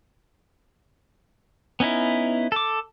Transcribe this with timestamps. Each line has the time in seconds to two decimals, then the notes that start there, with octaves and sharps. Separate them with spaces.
1.80 B3 C#4 D#4 E4
2.52 A4 D6